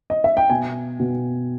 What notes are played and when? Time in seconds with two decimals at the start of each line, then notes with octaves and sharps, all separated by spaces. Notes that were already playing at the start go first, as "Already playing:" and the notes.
0.10 D#5
0.24 E5
0.37 G5
0.50 B2 G#5
1.00 B2